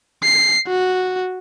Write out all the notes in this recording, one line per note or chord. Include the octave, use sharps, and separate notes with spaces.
C7
F#4